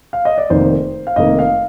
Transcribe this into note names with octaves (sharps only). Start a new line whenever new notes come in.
F5
D#5
D5
F1 F2 D#3 A#3 C5
F5
F1 F2 D#3 A#3 D#5
F5